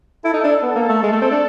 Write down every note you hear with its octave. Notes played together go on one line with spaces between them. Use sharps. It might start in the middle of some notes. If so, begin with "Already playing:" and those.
E4 A4
D#4
D4
B3 A4
A#3
A3
G#3
A3
C4
D4